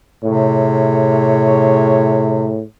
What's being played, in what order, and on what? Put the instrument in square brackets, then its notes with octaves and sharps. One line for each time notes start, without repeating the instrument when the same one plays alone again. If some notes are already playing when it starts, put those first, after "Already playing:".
[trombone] A2 [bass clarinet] C3 [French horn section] G#4 C#5